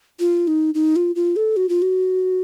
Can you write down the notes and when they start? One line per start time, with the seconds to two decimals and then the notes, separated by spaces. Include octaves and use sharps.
0.20 F4
0.47 D#4
0.75 D#4
0.96 F4
1.16 F4
1.36 A4
1.57 F#4
1.69 F4
1.82 F#4